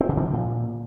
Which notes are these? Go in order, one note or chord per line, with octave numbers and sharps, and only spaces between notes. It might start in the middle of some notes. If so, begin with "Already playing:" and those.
C4
C#3
D3
F3
A#2